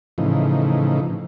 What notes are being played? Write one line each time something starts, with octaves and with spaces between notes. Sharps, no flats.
A2 C#3 E3 F3 D#4